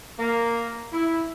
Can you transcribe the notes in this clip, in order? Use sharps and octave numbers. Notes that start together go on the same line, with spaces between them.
A#3
E4